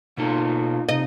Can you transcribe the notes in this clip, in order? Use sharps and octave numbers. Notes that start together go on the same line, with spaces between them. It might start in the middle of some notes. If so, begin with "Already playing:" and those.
B2 A#3 D#4 F4 A4
C3 D#4 D#5